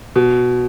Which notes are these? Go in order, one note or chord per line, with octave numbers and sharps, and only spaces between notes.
B2